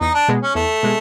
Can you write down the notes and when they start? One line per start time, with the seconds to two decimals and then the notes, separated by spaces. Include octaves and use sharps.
0.01 E2 D#4
0.14 D4
0.28 B2 G#3 B3
0.42 C#4
0.55 E2 A3
0.83 B2 G#3